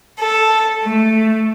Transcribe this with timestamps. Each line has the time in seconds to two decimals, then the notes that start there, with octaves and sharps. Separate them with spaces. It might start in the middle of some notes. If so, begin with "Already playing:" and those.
0.18 A4
0.83 A3